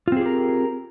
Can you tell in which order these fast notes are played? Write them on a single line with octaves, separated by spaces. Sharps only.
F4 C4 G#4 G4 A#4